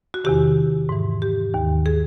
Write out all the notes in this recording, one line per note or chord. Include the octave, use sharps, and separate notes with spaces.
F#4
E2 C3 D#3 G4
G#2 E3
G4
D#2 D#3
G#4